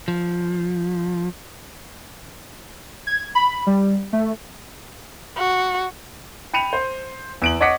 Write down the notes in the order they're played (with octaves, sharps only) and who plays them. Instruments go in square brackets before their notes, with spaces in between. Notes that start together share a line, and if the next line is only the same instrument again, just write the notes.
[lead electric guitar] F3
[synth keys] G#6
B5
G3
A3
[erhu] F#4
[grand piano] G5 B5 C#7 D#7 F7
C5
E2 D7 F#7
C#5 D#5 F#5 D6 B6 C#7